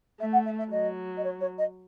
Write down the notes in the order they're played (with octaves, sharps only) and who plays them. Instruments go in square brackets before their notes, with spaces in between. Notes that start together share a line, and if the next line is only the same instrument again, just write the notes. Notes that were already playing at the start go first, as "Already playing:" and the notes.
[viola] A3 [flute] E5
[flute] F#5
E5
E5
[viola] F#3 [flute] D#5
[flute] D#5
C#5
C#5
D#5